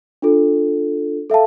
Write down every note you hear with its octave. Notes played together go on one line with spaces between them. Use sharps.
D4 F4 A4
A4 E5 F5 A5